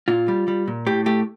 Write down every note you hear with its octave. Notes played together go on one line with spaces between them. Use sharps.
A#2 F4
G3
G3
A#2
A2 G4
A3 G4